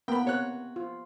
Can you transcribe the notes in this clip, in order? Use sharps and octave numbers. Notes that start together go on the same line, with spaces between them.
A#3 B3 G5 B5
C3 C#5 F#6
F4